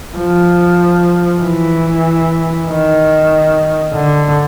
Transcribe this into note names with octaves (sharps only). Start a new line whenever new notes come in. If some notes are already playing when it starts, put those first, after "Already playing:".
F3
E3
D#3
D3